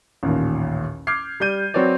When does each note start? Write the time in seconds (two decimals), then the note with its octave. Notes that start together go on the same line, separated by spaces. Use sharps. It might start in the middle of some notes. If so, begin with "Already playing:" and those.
0.23 A1 D#2 A#2
1.07 D6 F6 G6 G#6 C7
1.40 G3 D5 G6 D#7
1.74 F#3 C4 B4 C#5 D5